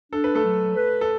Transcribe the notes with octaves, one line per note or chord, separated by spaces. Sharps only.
D4 A4
B4
A3 A4
F#3
B4
A4